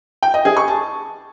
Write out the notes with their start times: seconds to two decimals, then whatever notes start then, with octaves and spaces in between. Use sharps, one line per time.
0.23 G5
0.34 D#5
0.45 G#4
0.57 C#6
0.68 A5